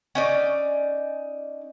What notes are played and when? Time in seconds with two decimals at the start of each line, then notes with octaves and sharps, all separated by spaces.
0.15 C#4 D#4 D5